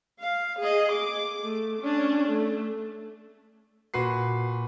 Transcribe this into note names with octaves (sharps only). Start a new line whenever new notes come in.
F5
G#4 D#5
D6
A3
C#4 D4
A3
A#2 F#4 B4 C7